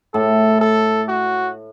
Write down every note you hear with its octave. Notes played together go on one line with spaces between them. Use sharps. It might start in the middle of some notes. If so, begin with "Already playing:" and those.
A2 A4
A4
F#4